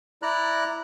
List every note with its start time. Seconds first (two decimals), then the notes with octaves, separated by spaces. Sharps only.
0.22 E4 D5 A#5 F#6